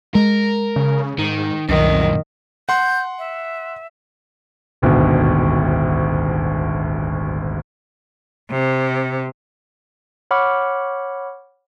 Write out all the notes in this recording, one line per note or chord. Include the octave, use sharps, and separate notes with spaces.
G#3 A#4
C#3
G#2 D#3
C2 F#2 A#2 D#3
F#5 C6 G6
E5
D#1 G#1 D2 B2
C3
C#5 F#5 B5 C#6 D6 F6